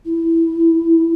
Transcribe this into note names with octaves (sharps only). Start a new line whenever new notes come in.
E4